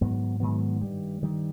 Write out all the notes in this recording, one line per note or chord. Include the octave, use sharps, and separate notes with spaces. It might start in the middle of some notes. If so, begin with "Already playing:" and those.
G#2 D#3 F#3 B3
G#2 D#3 F#3 B3
G2 D#3 G3
G2 D#3 G3